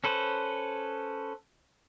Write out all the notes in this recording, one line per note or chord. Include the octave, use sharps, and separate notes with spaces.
C#4 A4 B4 C5